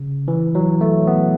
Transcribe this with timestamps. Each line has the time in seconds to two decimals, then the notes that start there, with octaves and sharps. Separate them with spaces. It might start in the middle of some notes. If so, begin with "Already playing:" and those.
Already playing: C#3
0.28 E3
0.55 F#3
0.81 A3
1.07 B3